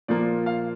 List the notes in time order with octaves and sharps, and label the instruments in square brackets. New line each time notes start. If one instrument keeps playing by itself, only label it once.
[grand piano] A#2 F3 A#3 D5
F5